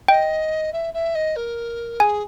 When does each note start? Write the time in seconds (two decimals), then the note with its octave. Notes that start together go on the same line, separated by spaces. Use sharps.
0.08 D#5 G5
0.72 E5
0.94 E5
1.15 D#5
1.36 A#4
2.00 G#4 G#5